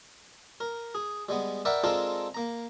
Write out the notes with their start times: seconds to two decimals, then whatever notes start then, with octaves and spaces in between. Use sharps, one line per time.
0.60 A#4
0.95 G#4
1.29 G3 G#3 B3
1.65 A#4 B4 D5 E5 F#5 G5
1.83 G#3 C4 D4 F4 A4 A#4
2.34 A#3 A#5